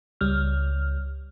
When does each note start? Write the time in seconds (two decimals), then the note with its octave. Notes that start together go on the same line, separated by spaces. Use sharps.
0.21 C#2 G3 F6